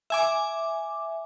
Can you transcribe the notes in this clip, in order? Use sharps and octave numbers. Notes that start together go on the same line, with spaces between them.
E5 G#5 D6